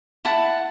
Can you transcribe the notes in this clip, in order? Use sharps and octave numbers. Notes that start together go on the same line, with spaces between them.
E4 F#5 A5